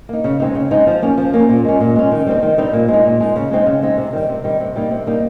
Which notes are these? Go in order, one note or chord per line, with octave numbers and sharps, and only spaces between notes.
A#3 D#4
C#3
G#3 C4 D#4
C#3
G#3 C4 D#4
F3
A#3 C#4
F3
A#3 C#4
A#2
G#3 C#4
A#2
G#3 C#4
D#3
G3 C4 D#4
D#3
G3 C4 D#4
A#2
G#3
D#4
A#2
G#3 D#4
C#3
G#3 C4 D#4
C#3
G#3 C4 D#4
C3
D#3 G3
C3
D#3 G3
C3
G3 A#3 D#4
C3
G3 A#3 D#4